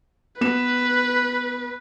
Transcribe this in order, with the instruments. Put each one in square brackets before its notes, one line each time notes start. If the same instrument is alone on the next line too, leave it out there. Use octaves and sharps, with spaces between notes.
[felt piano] B3 E7 [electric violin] B4